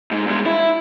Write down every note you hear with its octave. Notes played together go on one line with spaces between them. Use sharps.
G#2 G#3
E2 G#3
E4